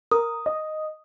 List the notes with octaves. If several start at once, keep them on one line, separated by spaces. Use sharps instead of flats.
A#4 D#6
D#5